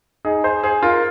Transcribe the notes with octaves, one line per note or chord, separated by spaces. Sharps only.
D#4 G#4
G#4 C5
G#4 C5
F4 A#4